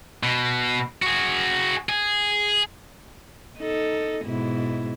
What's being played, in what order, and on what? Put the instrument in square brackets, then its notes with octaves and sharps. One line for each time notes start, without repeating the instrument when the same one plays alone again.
[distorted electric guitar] B2
F#4 G#4
G#4
[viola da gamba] D#4 A4
G#2 B2 E4